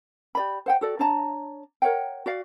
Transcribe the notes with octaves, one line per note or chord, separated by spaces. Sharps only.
G4 D5 B5
C5 F#5 G5
F#4 A4 D5
D4 C#5 A5 A#5
A#4 C#5 F#5 G5
F#4 D5 F5